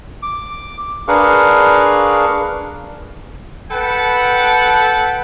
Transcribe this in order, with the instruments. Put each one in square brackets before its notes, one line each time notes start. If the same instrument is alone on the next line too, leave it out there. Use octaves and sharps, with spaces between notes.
[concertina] D6
D4 G#4 A#4 B4 F5 C#6
[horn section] A4 B4 F#5 G5 A5 B5